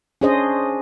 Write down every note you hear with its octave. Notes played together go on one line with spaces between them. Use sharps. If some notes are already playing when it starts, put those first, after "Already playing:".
C#4 D4 G#4 C5 D#5